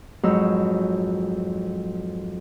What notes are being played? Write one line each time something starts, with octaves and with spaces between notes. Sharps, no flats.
F2 G#2 F#3 B4 C#5 E6